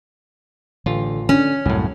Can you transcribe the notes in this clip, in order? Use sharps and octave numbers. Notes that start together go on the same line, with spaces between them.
A1 D3 F4
D3 C#4
C2 F#2 A2